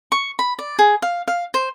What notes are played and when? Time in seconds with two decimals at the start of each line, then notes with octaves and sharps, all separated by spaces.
0.12 C#6
0.39 B5
0.59 D5
0.79 G#4
1.02 F5
1.28 F5
1.54 C5